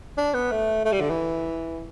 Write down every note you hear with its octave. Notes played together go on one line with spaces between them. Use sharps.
D4
B3
A3
A3
G3
D3
E3